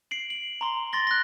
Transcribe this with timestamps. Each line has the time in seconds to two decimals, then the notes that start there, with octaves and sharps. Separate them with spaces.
0.11 C7 D7 F#7
0.30 F#7
0.61 A#5 C6
0.93 C6 A6 A#6 G7
1.07 F#6 A#6